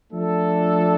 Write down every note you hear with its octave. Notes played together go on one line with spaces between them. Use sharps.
F3 A3 D4 A4